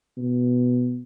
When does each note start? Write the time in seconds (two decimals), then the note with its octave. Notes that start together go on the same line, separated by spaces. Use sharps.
0.17 B2